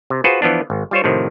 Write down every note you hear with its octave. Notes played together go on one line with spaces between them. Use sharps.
C3
F4 F#4 G#4 B4 C5 F#5
E3 F3 B3 D4
G#1
G3 F4 C5 C#5
A2 C3 D#3 F3